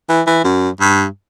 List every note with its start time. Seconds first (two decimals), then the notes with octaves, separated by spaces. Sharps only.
0.09 E3
0.27 E3
0.44 F#2
0.81 G2